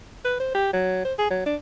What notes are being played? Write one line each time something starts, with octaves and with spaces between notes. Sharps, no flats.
B4
C5
G4
F#3
C5
G#4
F#3
D4